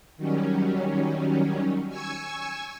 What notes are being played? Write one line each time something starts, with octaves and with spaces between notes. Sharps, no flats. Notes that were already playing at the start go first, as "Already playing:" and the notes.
D#3 F#3 G3 C#4
G#5 C#6 E6 G#6